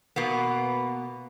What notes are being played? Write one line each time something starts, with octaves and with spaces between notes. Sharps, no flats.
B2 A#3 B3